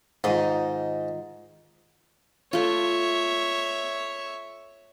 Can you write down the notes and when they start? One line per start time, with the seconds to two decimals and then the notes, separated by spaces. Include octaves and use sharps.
0.24 G#2 D#3 D#4 F4
2.53 A3 F4 C#5 E5